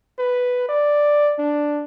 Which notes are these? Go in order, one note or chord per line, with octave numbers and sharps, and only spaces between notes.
B4
D5
D4